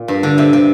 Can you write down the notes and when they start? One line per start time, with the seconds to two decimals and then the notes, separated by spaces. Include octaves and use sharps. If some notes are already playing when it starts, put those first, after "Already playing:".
Already playing: A#2
0.08 G2
0.23 D3
0.38 C3
0.53 C3